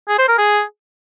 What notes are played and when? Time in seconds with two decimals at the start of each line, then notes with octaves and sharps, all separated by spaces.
0.09 G#4
0.19 C5
0.28 A#4
0.38 G#4